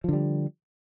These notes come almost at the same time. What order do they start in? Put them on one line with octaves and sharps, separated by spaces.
F3 D3 G3